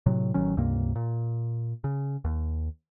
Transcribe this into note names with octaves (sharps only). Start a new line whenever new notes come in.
A2 C3 F#3
A1 D#3 F#3 C#4
C#2 G2 C3 A#3
A#2
C#3
D#2